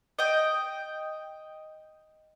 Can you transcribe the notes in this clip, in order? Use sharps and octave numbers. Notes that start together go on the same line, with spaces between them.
D#5 G5